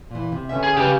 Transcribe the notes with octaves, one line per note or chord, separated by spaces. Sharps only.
A#2 E3
C3
D3 B3 C#4 E5
G#4
C#3 G4 B4 F5